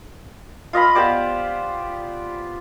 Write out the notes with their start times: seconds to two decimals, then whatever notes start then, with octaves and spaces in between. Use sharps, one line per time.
0.73 F4 D#5 F5 B5
0.95 B3 G4 C5 D5